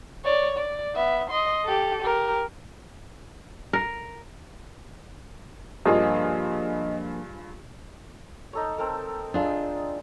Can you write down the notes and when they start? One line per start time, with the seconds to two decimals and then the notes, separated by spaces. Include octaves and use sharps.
0.25 C#5 D5
0.57 D5
0.95 B3 E5
1.30 D#5 C6
1.65 G4 A4
2.02 G4 A#4
3.73 A#4
5.85 G2 F3 A#3 D4 F4 G#4 D#5
8.53 D#4 A4 C#5
8.78 C4 A4 A#4
9.34 G#3 D4 F4